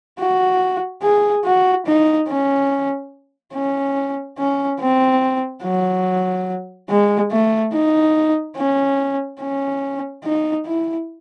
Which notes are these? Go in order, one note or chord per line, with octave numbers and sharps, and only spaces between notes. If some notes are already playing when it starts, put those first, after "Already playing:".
F#4
G#4
F#4
D#4
C#4
C#4
C#4
C4
F#3
G#3
A3
D#4
C#4
C#4
D#4
E4